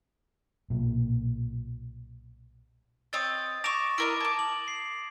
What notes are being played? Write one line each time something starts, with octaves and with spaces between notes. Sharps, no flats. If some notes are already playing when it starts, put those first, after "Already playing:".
B1 A#2
C4 C#5 D#5 D#6 A6
C#6 D6 A#6 E7 F7
E4 A#4 D#5 D6 D7
A5 D6 G#6
F#7
C7